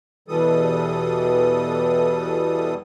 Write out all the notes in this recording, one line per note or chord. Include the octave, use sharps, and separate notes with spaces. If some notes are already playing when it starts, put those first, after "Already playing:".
E2 B2 E3 G3 A4 D#6